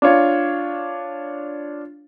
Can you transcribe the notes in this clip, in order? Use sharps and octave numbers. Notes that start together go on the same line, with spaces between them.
D4 F4 C#5